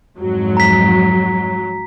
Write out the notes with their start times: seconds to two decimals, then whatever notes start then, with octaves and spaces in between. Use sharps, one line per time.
0.19 F2 G#2 F#3
0.57 A#5 B6